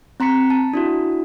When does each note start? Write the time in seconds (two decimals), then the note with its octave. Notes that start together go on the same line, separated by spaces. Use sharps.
0.20 C4 A#5 C6 B6 C#7
0.50 A5
0.74 D4 E4 F#4